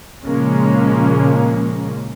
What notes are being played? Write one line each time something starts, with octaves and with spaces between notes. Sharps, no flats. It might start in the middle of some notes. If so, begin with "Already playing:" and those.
A#2 C#3 F3 G#3 A#3 C#4